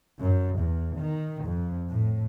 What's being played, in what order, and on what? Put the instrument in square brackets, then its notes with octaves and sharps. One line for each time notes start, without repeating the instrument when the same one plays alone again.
[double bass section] F#2
E2
D#3
F2
A2